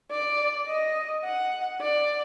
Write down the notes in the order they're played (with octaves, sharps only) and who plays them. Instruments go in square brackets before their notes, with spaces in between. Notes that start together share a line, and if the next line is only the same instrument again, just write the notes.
[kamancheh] D5
D#5
F#5
D5